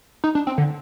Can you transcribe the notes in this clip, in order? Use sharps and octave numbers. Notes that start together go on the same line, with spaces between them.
D#4
D4
C4
D3